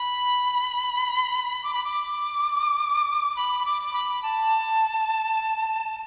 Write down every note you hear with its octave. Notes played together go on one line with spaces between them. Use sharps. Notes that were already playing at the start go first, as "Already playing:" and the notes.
Already playing: B5
D6
B5
D6
B5
B5
D6
B5
A5